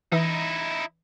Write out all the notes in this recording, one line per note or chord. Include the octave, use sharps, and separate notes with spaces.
E3 D#4 E4 E5